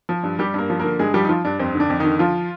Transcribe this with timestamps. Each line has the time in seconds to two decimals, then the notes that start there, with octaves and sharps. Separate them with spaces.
0.09 F3
0.23 G2
0.39 G2 G3 G4
0.54 G2 A#3 A#4
0.70 F3
0.80 D3 A#3 A#4
0.99 G2 G#3 G#4
1.14 F3 G3 G4
1.25 D#4
1.29 F3 F4
1.45 G2 D4
1.59 F2 C4
1.75 D3 D4
1.90 F2
2.00 D3 D#3 D#4
2.19 F3 F4